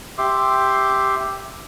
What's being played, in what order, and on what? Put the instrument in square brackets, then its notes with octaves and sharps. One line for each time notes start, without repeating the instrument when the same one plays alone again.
[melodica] G4 E5 C6 D6